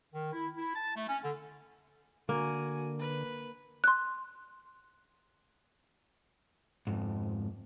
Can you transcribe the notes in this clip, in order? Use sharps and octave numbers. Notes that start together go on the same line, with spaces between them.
D#3
E4
E4
A5
A3
C#4
D3
D3 A#3 F#4 G#5
B4
C6 F#6
F2 G#2